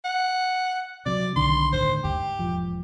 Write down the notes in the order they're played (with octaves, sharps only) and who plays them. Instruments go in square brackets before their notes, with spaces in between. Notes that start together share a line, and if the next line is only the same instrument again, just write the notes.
[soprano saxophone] F#5
[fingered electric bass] C3 F#3 [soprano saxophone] D5
[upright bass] B1 [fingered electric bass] D3 D#3 [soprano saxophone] C6
[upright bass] D#2 A2 [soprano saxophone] C5
[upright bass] D#2 G#2 [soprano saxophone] G4
[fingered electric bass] E1 F3